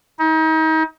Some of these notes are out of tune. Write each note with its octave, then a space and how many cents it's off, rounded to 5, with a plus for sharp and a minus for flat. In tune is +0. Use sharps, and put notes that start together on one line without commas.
D#4 +35